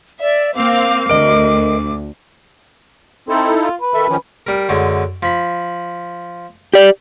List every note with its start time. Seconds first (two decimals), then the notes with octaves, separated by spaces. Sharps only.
0.21 D5 E5
0.56 A#3 C4 F5 D6
1.09 D2 A#4 D#5
3.29 C4 D#4 E4 A4
3.61 F4
3.81 B4
3.94 D#3 A4 E5
4.09 D#3 F3 C#4
4.47 G3 A#4
4.69 F#2 D3 G#3
5.22 F3 B5
6.74 G4 D5